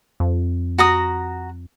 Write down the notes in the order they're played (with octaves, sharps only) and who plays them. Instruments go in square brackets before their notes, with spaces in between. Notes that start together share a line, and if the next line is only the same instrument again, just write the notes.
[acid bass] F2
[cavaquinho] F#4 A#5 D#6